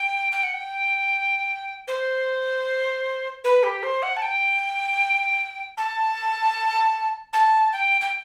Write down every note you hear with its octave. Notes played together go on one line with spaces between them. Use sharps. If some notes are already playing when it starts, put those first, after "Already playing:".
Already playing: G5
G5
F#5
G5
C5
B4
G4
C5
F#5
A5
G5
A5
A5
G5
G5